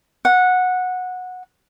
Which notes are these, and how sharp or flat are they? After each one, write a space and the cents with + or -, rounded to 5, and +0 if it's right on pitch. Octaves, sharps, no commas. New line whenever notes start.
F#5 -15